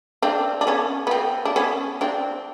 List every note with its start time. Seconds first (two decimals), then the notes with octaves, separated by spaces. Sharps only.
0.22 C4 D4
0.61 D4
0.67 B3 C#4
1.07 B3
1.11 C4
1.45 D4
1.56 B3 C#4
2.01 C4 D4